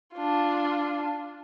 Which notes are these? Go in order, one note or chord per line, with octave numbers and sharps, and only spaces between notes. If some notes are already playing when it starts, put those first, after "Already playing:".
D4 F4